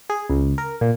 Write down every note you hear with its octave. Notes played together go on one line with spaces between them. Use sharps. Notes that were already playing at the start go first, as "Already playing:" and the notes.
G#4
C#2
A#4
A#2